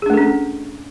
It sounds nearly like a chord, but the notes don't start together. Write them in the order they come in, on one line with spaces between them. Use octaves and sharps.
G#4 D4 A3 A4 C#4